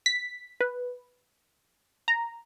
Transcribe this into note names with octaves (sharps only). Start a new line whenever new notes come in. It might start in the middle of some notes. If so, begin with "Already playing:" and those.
B6
B4
A#5